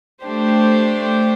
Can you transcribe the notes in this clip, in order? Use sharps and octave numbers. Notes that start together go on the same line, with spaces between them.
A3 D4 G4 C5